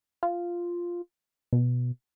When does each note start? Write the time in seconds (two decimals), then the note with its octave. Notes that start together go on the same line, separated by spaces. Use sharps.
0.23 F4
1.53 B2